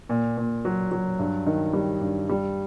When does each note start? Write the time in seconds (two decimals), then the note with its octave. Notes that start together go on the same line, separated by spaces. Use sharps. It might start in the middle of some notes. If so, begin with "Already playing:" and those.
0.09 A#2
0.37 A#2
0.65 F#3
0.92 F#3
1.19 G2
1.46 D#3
1.73 G3
2.01 G2
2.29 G3